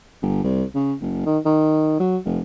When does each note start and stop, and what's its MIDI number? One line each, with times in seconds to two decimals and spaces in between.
0.22 0.44 31
0.44 0.64 36
0.75 0.94 49
1.01 1.22 30
1.26 1.38 51
1.45 1.96 51
2.00 2.17 54
2.25 2.40 29